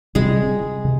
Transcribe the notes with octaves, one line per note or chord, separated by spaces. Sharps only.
C3 G3 G#3 C4 G#4
C3